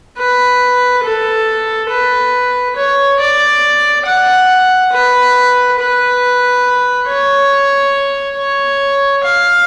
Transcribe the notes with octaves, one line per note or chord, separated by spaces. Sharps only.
B4
A4
B4
C#5
D5
F#5
B4
B4
C#5
C#5
F5